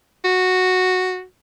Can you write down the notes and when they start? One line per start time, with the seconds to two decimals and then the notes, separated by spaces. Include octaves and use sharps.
0.25 F#4